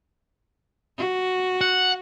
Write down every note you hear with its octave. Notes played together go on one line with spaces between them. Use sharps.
F#4
F#5